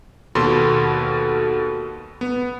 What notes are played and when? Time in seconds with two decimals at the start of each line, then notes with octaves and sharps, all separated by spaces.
0.35 D#2 B2 F#4 A4 B5 C6
2.21 B3